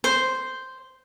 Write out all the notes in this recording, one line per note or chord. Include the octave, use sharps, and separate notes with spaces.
C5